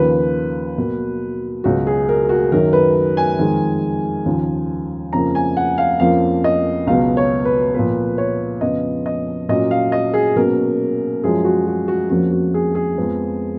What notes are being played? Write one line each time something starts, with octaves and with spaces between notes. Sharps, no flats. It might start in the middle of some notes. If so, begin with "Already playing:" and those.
Already playing: D#2 C#3 F3 A#3 B4
B2 F#3 A#3
C#2 B2 F#3 F#4
G#4
A#4
F#4
F#2 D#3 F#3 A#4
B4
G#5
F2 D#3 G#3
D#2 C#3 F3
F2 C#3 F3 A#3 A#5
G#5
F#5
F5
F2 F3 A#3 C#4 F5
D#5
C#2 B2 F#3 B3 F5
C#5
B4
A#2 F3 B3 B4
C#5
F2 C#3 F3 B3 D#5
D#5
A#2 F#3 C#4 D#5
F5
D#5
G#4
B2 F#3 A#3 C#4 A#4
F#2 F3 G#3 G#4
F#4
F#4
F#4
F2 F3 A#3 C#4 F#4
F#4
G#4
G#4
F2 F3 G#3 B3